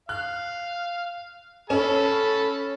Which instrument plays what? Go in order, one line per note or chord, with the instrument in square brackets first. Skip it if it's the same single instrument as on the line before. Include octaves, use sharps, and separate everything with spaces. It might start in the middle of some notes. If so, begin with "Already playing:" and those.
[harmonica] F5 [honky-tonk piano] F#6
[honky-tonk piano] C#4 [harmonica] A4 A5 B5